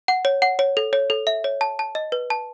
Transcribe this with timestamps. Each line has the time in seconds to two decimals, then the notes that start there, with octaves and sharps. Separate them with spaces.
0.08 F#5
0.25 C#5
0.42 F#5
0.59 C#5
0.77 A4
0.93 C#5
1.10 A4
1.27 E5
1.44 C#5
1.61 A5
1.79 A5
1.95 D#5
2.12 B4
2.30 A5